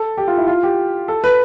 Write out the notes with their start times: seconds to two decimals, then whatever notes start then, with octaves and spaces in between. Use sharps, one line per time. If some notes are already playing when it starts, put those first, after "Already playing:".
Already playing: A4
0.17 G4
0.28 F4
0.38 E4
0.47 F4
0.63 G4
1.08 A4
1.24 B4